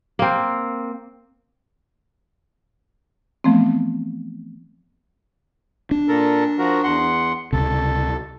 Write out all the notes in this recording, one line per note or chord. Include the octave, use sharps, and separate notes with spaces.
A#3 C4
E3 F3 A3 B3 C4
D4
A#2 A4 A#4
F3 F#4 A#4
E2 F#5 C6
C#2 C3 A4